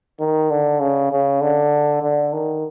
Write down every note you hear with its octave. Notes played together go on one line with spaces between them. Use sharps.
D#3
D3
C#3
C#3
D3
D3
D#3